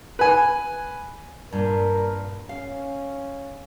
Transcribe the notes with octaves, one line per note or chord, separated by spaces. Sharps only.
B4 G#5
G2 A#2 A#4
C#4 F5